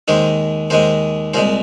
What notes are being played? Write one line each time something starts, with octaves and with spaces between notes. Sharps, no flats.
D#2 D#3 G#3 C5
D#2 D#3 G#3 C5
C2 A#2 G#3 C5